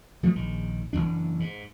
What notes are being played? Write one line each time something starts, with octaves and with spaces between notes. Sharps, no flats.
F3 G3 A3
A#1 D#3
F#1 F2 E3 D4
G#2